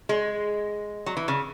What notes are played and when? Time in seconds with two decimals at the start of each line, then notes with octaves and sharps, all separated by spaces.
0.09 G#3
1.06 F#3
1.17 E3
1.28 C#3